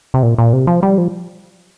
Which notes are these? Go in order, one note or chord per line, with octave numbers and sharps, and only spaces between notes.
C3
A#2
A#2
C3
F3
G3
F3